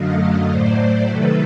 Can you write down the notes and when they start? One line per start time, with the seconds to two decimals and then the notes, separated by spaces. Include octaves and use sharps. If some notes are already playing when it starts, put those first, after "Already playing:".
Already playing: F#2 D3 F#3 A3 D#5 F5
0.21 D#5 F5
0.50 A2 F#3 A3 C5 D5
1.09 C3 D#3 F#3 A3 A4 B4